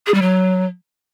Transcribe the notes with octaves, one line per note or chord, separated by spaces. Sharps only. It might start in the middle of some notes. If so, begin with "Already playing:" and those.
G#4
G3
F#3